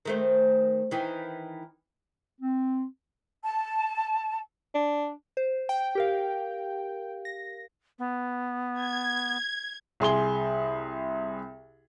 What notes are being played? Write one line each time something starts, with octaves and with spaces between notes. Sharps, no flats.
D#3 A3 C4
D#3 E3
C4
A5
D4
C5
G5
G4 A#4 F5
A#6
B3
G#6
C2 G#4 C6 G7